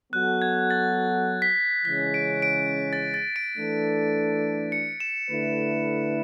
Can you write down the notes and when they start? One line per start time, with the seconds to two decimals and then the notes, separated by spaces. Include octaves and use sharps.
0.13 F#3 B3 F#4 A4 F#6
0.42 G#6
0.71 A6
1.42 B6
1.85 C#3 E3 G#3 C#4 B6
2.14 D7
2.42 D7
2.93 A6
3.14 A6
3.36 D7
3.57 E3 A3 D4 A4
4.72 C#7
5.00 E7
5.29 D3 A3 E4 B4